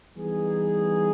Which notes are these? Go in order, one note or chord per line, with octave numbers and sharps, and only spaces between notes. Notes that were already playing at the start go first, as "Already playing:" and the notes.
E3 G3 B3 D#4 G#4